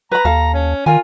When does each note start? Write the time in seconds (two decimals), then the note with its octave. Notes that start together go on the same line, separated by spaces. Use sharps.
0.12 B4 A#5 B5
0.25 D#2 A4 F5
0.54 C#4
0.86 D#3 F4 A#4 G#5